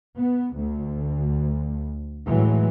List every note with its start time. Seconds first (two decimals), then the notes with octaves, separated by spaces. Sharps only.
0.16 B3
0.55 D2
2.25 A2 E3 F#3 G#3